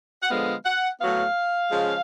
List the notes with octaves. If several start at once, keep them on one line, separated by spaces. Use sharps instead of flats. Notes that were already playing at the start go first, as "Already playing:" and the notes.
F#5
D3 F3 G#3 B3 F5
F#5
A2 F#3 B3 F5
C#3 F3 G#3 C#4